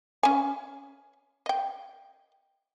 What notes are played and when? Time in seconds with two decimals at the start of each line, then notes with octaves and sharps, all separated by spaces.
0.23 C#4 G#5
1.46 D#5 G5